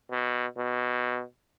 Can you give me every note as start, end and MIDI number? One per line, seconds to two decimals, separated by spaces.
0.11 0.46 47
0.57 1.23 47